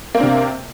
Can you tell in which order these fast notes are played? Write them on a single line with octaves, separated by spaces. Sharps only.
A#3 C4 D4 C3